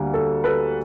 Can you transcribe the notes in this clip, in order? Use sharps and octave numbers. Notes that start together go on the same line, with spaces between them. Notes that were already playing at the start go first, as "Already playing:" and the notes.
Already playing: D2 D3 G3 A#3
A4
A4 B4